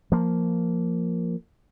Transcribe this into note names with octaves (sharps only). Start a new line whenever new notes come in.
F3 A#3